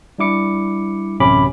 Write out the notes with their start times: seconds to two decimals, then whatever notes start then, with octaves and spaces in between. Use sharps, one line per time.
0.18 G3 D4 E4 D6 C#7
1.20 A1 F#2 C3 C#4 B5 D6